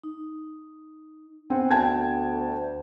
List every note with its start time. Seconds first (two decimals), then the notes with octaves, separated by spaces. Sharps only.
0.04 D#4
1.50 B3 C4 C5 F#5 G#5
1.71 D2 G5 A5 G#6